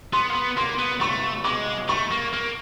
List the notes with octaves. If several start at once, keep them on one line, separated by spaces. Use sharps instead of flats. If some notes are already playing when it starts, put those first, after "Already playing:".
B3 C6
A#3
B3
A#3 C6
B3
A3 C#6
G#3 D6
A3 C#6
A#3
A#3